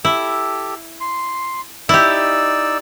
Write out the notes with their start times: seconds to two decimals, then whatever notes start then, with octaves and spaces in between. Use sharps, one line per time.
0.05 E4 G4 A4
1.01 C6
1.89 D#4 E4 G4 D5 E6